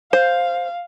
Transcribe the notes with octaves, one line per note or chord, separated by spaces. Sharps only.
C5 F5